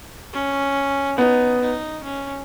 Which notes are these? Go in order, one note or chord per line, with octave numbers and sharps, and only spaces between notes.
C#4
B3 D#4
D#4
C#4